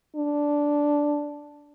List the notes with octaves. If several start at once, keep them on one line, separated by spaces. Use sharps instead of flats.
D4